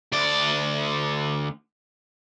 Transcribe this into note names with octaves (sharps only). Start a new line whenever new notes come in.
D2 D5